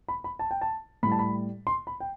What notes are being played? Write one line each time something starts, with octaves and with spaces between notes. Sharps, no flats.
B5
B5
A5
G5
A5
A2 G3 A5 B5
B5
C6
B5
G5